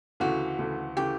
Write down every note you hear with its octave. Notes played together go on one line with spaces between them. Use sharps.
D2 C#3 E3 A3 F#4
D2 C#3 E3 A3
C#3 E3 A3 G4